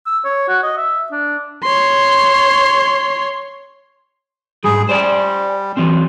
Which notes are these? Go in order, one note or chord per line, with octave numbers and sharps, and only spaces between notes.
E6
C#5
F#4
D#5
E5
D4
C#5 C6
G#2 G3 G#4
G3 C5 D5 G#5
E3 F#3 C4